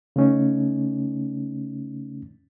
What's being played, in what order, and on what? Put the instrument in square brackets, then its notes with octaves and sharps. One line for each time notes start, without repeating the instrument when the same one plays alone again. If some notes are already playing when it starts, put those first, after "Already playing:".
[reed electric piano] C#3 A3 C#4 D#4